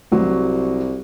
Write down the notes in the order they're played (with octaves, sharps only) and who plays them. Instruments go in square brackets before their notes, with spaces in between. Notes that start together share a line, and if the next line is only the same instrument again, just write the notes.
[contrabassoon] C2 [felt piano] F#3